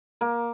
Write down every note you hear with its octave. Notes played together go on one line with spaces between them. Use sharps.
A#3